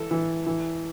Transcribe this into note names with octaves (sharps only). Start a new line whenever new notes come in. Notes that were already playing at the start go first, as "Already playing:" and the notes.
Already playing: E3 A4
E3
E3